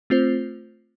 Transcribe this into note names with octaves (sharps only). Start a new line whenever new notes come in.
A3 C4 F4 C5